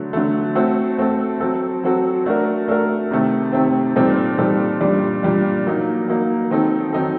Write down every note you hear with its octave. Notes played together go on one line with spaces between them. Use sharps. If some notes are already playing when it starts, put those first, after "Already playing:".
Already playing: D3 F#3 A3
D3 F#3 A3
A3 C4 F#4 A4
A3 C4 F#4 A4
F#3 C4 F#4 A4
F#3 C4 F#4 A4
A3 D4 F#4 A#4
A3 D4 F#4 A#4
C3 D#3 A3 C4
C3 D#3 A3 C4
A#2 G3 C4 D#4 A4
A#2 G3 C4 D#4 A4
A#2 G3 D4
A#2 G3 D4
F#3 A#3 D#4
F#3 A#3 D#4
D#3 F#3 C4 D#4 A4
D#3 F#3 C4 D#4 A4